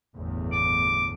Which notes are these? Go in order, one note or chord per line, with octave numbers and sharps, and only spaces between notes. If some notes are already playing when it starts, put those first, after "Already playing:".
G1 E2 A2
D6